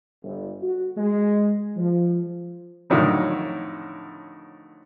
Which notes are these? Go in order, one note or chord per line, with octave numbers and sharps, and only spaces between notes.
G1
F#4
G#3
F3
F2 A2 D3 D#3 F#3